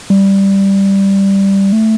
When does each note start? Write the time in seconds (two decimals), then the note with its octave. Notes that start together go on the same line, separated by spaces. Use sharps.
0.10 G3
1.72 A3